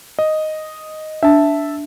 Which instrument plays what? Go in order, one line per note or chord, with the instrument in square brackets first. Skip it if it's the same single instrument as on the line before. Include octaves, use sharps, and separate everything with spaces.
[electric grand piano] D#5
[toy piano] D4 [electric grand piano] E5 A5